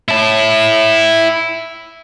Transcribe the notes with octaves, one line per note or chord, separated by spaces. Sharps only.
E4 A5